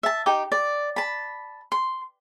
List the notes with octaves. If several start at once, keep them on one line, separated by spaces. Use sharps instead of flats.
E5 A5
D#4 G4 G5 D6
D5
A5 B5
C6